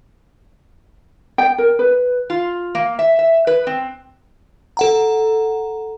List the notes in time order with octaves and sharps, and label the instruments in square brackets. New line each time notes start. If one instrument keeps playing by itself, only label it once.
[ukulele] G5
A#4
B4
[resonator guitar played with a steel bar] F4
A#3
E5
E5
B4
C4
[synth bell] A4 F#5 A#5